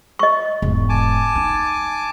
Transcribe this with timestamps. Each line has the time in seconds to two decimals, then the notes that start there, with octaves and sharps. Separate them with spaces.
0.19 D#5 C#6
0.62 E1 G#2
0.89 G#5 A5 D6
1.36 D#4